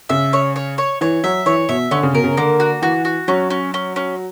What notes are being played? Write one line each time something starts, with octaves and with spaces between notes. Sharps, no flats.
C#3 E5
C#5
C#5
C#5
E3 C#5
F#3 E5
E3 C#5
B2 E5
D3 C#4
C#3
B2 A#4
C#3
D3 A#3
F#4
E3 F#4
F#4
F#3 C#4
C#4
C#4
C#4